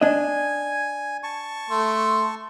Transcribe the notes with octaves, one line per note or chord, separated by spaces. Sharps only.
D4 D#5 G#5
A5 C#6
A3 C6